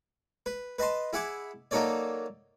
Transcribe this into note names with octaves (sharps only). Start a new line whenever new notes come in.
B4
B4 D#5 A5 C6
E4 G#4 E5 F#5 D6
F#3 A#3 D#4 A4 C#5 D5